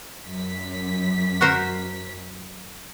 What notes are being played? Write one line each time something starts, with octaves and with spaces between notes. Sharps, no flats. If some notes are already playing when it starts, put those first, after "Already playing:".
F#2 B6
F#4 A#4 C5